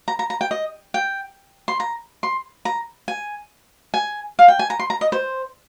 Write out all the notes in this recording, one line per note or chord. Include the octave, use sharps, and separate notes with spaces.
A#5
A#5
A#5
G5
D#5
G5
C6
A#5
C6
A#5
G#5
G#5
F5
G5
G#5
A#5
C6
A#5
D#5
C5